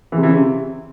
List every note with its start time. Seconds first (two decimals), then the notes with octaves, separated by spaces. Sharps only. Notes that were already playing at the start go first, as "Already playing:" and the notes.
0.12 E3
0.18 C3
0.23 E3
0.29 C#3
0.34 C3